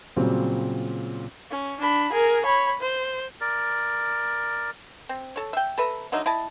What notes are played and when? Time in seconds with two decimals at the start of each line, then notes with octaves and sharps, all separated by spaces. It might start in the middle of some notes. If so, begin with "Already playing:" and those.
0.17 A#2 C#3 F#3 G3 C4
1.51 C#4
1.80 D4 B5
2.12 G#4 A#4
2.45 C#5 B5
2.81 C5
3.41 A#4 D5
5.09 C4
5.36 A4 C#5
5.53 E5 G5
5.78 A4 B4 E5 A#5
6.12 D3 F#3 D#4 E5
6.26 E4 D#5 A5